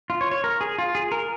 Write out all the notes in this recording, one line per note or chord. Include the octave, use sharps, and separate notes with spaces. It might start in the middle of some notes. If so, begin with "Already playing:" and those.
F4
C#5
C#5
A#4
G#4
F4
G#4
A#4